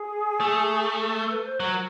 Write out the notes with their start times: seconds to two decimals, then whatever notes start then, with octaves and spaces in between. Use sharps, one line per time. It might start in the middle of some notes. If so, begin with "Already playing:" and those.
Already playing: G#4
0.40 A3
0.90 G#4
1.00 A4
1.15 A4
1.31 B4
1.45 C5
1.60 F#3 A#4